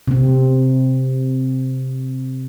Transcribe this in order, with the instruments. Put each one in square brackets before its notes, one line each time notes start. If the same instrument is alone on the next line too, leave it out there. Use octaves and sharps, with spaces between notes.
[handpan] C3 C4